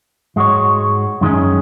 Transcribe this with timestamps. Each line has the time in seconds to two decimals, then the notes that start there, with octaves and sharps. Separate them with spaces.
0.36 G#2 G#3 F#4 C#5
1.21 F#2 D#3 G#3 C#4